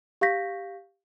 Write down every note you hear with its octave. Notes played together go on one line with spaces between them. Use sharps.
G4 F5 C#6 G6 A#6 B6